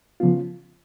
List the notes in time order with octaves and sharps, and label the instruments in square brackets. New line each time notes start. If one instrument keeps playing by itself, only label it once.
[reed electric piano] C#3 F3 B3 F4